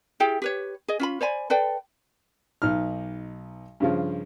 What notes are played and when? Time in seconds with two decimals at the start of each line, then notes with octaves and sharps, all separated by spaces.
0.20 E4 G4 G#4 G5
0.42 G4 B4 C#5
0.88 G#4 D#5
1.00 C#4 F4 B5
1.21 C5 D5 G#5 B5
1.50 A4 B4 D5 G5
2.62 B1 D#4 F6
3.80 G2 C#3 F3